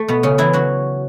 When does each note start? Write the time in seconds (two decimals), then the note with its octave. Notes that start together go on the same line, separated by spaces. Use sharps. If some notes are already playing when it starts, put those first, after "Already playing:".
Already playing: A3
0.08 B2 B3
0.23 C#3 C#4
0.38 E3 E4
0.53 F#3 F#4